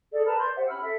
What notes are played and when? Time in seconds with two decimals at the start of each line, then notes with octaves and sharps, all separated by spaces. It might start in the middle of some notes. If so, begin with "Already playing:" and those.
0.12 G#4 A4 D5
0.26 A#4 B4 A5 B5
0.39 D5 C6 G6
0.55 G4 C5 E5 F#5
0.68 C#4 B5 E6 F6
0.82 A4 E5